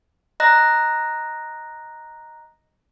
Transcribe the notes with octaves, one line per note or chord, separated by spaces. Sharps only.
D#5 A#5 F#6 A#6